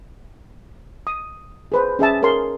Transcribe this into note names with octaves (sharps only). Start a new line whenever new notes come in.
D#6
G#4 B4 C5
C#4 G#4 E5 A5
G#4 A#4 C#5 A5 C6